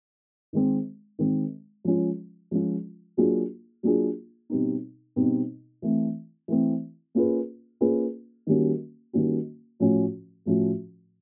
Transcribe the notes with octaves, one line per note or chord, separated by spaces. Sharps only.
D#3 G#3 C4
D#3 G#3 C4
F3 G#3 C#4 F4
F3 G#3 C#4 F4
F#3 A#3 D4 F4 G#4
F#3 A#3 D4 F4 G#4
B2 G3 C4 D#4
B2 G3 C4 D#4
E3 A3 C4
E3 A3 C4
A#3 C#4 F4 G#4 B4
A#3 C#4 F4 G#4 B4
D#3 G3 A#3 C#4 F#4
D#3 G3 A#3 C#4 F#4
A2 F3 A3 C#4 F#4
A2 F3 A3 C#4 F#4